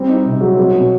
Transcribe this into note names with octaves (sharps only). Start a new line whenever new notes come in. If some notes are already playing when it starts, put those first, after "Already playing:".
Already playing: G3 C4
D#4
C3
F#3
F#3
B2